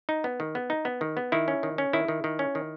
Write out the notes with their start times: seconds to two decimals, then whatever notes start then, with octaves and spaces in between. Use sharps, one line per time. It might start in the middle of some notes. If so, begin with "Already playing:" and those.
0.09 D#4
0.24 B3
0.40 D#3
0.55 B3
0.70 D#4
0.85 B3
1.01 D#3
1.17 B3
1.32 D#3 E4
1.48 C#4
1.63 D#3
1.78 C#4
1.93 D#3 E4
2.08 D#3
2.24 D#3
2.39 C#4
2.55 D#3